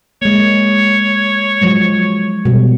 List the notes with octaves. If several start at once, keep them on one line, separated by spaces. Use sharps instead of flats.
G#3 A#3 C#5
F3 F#3 G#3
B2 G3